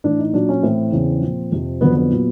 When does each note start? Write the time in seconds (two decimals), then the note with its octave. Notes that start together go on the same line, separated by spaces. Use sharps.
0.04 A2 E3 D4
0.19 D#4
0.33 A#2 F#3 D4
0.49 C#4
0.63 A2 E3 C4
0.92 E2 C#3 E3
1.22 A#2 F3
1.52 F2 C3 F3
1.81 F2 D3 F#3 B3
1.96 B3
2.10 A#2 F#3